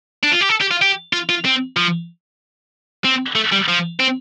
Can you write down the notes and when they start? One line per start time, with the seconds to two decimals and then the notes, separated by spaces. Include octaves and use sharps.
0.23 D4
0.32 F4
0.41 G4
0.49 A4
0.61 G4
0.71 F4
0.82 G4
1.13 F4
1.29 F4
1.45 C4
1.77 F3
3.05 C4
3.35 A3
3.52 G3
3.68 F3
3.99 C4